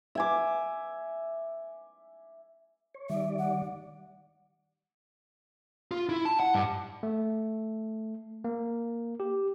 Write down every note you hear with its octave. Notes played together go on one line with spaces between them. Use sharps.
E5 G#5 D6
C#5
D#3 G3 D5 E5
F#5
F4
E4
A5
F#5
G2
A3
A#3
G4